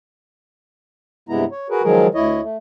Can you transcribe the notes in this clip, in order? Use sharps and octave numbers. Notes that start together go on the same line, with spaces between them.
G2 C3 G#3 B3 E4 A#5
C#5
F#4 G#4 A#4 B4
D#3 F3 F#3 G#3 G#4 A#4
D2 E4 C#5 D#5
A3